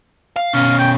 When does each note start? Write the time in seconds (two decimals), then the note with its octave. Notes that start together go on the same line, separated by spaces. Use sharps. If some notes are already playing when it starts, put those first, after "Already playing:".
0.37 F5
0.53 B2 C#4 F5
0.79 G5